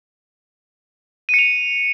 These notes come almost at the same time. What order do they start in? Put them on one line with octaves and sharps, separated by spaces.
D#7 C#7 F7